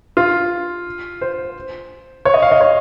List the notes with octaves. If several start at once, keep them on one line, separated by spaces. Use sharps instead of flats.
F4
C5
C#5
D#5
F5
D#5
C#5